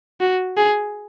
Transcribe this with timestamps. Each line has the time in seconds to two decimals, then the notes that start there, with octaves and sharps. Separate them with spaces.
0.21 F#4
0.57 G#4